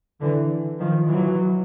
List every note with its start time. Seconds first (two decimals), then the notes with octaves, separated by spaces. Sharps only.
0.21 D3 E3
0.79 D#3 F3
1.09 E3 F#3